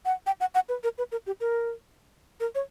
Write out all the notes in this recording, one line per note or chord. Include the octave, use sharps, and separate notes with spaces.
F#5
G5
F#5
F#5
B4
A#4
B4
A#4
G4
A#4
A#4
C#5